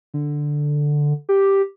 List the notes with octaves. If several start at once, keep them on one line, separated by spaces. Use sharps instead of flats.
D3
G4